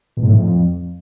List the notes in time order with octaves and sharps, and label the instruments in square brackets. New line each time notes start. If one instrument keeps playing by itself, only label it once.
[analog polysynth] B2
G#2
A2
F2